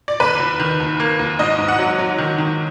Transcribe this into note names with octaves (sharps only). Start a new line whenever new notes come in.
D5
D#2 B4
D#2
D#3
D#2
A#3
D#2
G#2 D#5
G#2
F#5
F#3
F#3
D#3
D#3